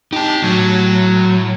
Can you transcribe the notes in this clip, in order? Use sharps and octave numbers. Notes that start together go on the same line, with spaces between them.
D#4 G4 A5
A2 F#3